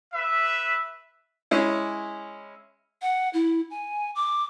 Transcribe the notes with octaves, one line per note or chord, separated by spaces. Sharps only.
B4 E5
G#3 C#4 E4
F#5
E4
G#5
D6